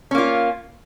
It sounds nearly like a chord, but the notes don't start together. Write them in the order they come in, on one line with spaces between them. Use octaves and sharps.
C#4 A#3 F4